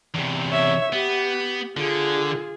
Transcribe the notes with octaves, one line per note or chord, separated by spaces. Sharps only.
E2 C3
C#5 E5
B3 G4
D3 F4 G#4